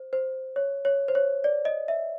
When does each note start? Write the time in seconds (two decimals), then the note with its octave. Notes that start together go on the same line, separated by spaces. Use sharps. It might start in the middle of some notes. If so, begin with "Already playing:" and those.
Already playing: C5
0.13 C5
0.56 C#5
0.85 C#5
1.08 C5
1.15 C#5
1.44 D5
1.65 D#5
1.88 E5